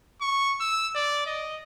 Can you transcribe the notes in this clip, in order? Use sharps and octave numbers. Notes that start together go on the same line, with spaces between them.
C#6
E6
D5
D#5